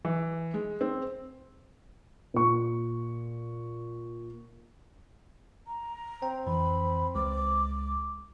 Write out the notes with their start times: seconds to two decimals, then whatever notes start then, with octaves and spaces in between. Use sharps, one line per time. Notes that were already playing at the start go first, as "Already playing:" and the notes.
0.05 E3
0.54 G#3
0.81 C4
2.34 A#2 C#6
5.67 A#5
6.22 C4 G5
6.47 F2 E3 B5
7.15 C#2 G#3 D6